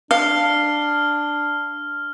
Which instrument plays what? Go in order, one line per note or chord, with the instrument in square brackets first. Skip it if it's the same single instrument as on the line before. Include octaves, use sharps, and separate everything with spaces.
[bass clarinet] D4 [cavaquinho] F5 [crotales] F6